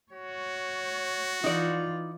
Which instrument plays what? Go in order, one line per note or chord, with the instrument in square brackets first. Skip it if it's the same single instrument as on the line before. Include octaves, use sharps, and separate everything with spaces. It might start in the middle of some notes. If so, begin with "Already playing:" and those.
[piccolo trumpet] F#4 [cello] C#5
[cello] E3 F4 [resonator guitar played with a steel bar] D#4 D5